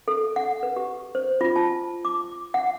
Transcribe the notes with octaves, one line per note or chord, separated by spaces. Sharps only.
A4
F#5
B4
G4
C5
F4
A5
D6
F#5